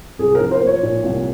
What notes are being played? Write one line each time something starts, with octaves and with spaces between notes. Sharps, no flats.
C2 G#4
A#4
F3
C5
A#3
C#5
A#2
C2